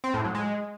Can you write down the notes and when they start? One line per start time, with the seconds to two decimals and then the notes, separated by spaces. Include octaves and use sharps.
0.04 C4
0.14 A2
0.24 F#3
0.35 G#3